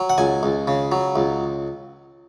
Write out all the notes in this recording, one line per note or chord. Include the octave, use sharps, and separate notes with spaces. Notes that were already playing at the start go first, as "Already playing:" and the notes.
Already playing: F#3
F#5
C#2 G#5
C#2
C#3
F#3
C#2